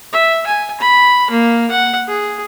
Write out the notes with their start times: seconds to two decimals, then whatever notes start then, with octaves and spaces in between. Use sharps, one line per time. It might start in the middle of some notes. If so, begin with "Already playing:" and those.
0.13 E5
0.46 G#5
0.80 B5
1.31 A#3
1.71 F#5
2.08 G#4